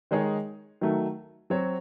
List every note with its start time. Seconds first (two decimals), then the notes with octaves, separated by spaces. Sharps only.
0.11 D#3 G#3 D#4 G#4 C#5
0.81 D#3 F#3 A3
1.50 F#3 C4 F#4 C#5